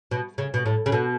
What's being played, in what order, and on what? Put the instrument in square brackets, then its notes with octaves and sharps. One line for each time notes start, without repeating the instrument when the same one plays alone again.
[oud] B2
C#3
B2
A2
C#3
B2